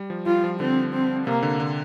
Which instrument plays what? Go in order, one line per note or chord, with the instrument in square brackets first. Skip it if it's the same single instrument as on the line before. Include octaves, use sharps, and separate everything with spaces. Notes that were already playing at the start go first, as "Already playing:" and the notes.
Already playing: [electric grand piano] G3
F3
[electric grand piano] G3 [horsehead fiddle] F4
[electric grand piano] F3
[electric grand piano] D3 [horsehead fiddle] C4
[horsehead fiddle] C4
[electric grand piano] C3 [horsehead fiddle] A#3
[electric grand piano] D3
D3